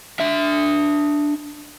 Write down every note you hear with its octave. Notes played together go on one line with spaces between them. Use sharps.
D4 E5